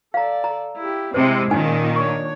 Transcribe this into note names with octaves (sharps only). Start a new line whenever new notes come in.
A4 D5 F5 A#5
A#5
E4 G4
C3 G#3 C4 E4 C5
A#2 D#3 C#4 D#4 F4 G#5
D4 C#5 C#6